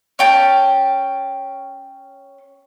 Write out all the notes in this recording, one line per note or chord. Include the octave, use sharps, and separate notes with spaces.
C#4 G5 A5